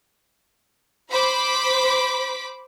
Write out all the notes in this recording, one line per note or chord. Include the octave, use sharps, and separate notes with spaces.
C5 B5 D6 B6